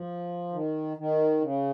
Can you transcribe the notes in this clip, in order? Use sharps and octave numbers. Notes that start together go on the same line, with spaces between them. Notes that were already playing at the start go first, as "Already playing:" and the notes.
Already playing: F3
D#3
D#3
C#3